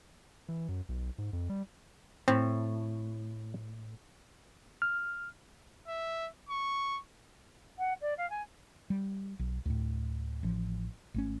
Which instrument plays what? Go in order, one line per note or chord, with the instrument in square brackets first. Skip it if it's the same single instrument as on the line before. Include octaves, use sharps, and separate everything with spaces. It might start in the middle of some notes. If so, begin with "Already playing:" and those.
[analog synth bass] E3
F#2
B1
G#2
F2
G3
[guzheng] A2 [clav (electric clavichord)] C4
[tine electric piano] F6
[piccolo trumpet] E5
C#6
[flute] F#5
D5
F5
G#5
[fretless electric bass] G3
B1
D2 A2
A1 F3
G#1 A3 C#4